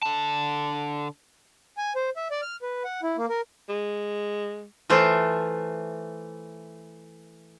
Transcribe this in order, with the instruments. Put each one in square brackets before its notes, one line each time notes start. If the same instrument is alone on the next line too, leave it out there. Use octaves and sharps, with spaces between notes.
[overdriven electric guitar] D3 A5
[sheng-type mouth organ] G#5
C5
E5
D5
F6
B4
F#5
E4
A#3
A#4
[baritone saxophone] G#3
[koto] E3 A3 F4 C5 A5